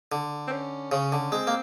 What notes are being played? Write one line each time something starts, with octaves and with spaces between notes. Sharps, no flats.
D3
C4
C#4
C#3 C#4
D3
G#3 C4
A#3